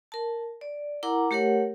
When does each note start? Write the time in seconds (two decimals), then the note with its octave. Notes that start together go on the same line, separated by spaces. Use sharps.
0.12 A#4 A5
0.61 D5
1.03 E4 A#4 F#5 A#5 D6
1.31 A3 G4 A#4 C#5 F#5